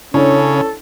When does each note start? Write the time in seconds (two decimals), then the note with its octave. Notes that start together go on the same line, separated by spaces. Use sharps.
0.14 C#3 C#4 D4 E4 A4 C#5